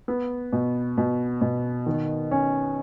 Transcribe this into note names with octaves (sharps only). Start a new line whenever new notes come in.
B3
B2
B2
B2
D#3
C#4